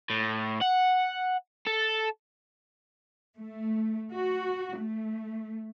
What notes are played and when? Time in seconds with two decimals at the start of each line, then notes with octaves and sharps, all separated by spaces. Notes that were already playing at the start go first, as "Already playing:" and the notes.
0.10 A2
0.61 F#5
1.67 A4
3.37 A3
4.12 F#4
4.79 A3